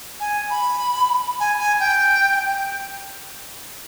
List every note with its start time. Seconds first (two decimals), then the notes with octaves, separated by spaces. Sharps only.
0.20 G#5
0.50 B5
1.40 G#5
1.59 G#5
1.80 G5